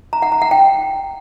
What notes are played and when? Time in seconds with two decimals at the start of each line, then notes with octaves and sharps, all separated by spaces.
0.13 A#5
0.22 F#5
0.32 A#5
0.42 F#5
0.51 G5